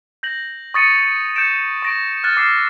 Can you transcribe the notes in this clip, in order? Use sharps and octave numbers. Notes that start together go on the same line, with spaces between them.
G6 A#6 F#7
C#6 D#6 A6 A#6 C#7 D#7
G6 A6 C#7 D7 E7
C#6 A#6 D7
F6 F#6 A6
D6 E6 F6 C7